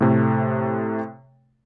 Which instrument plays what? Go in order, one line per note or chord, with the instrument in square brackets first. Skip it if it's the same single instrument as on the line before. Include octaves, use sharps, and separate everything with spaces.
[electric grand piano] A2 C3 A3